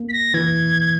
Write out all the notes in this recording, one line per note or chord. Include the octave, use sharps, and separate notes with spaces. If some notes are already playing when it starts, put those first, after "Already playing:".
Already playing: A#3
B6
A#6
E3 G#6